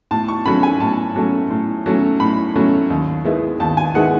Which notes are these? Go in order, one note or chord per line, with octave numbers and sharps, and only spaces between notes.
A2 A5
C#6
F#3 A3 C#4 B5
G#5
A2 A5
F#3 A3 C#4
A2
F#3 A3 C#4
A2 B5
F#3 A3 C#4
D#2
D#3 G#3 B3 E4
D#2 A5
G#5
D#3 G#3 B3 E4 F#5